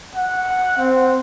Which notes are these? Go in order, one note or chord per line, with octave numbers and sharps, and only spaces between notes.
F#5
C4